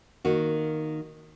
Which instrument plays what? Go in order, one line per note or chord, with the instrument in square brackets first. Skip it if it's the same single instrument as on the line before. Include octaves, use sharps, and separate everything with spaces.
[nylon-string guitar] D#3 A#3 F#4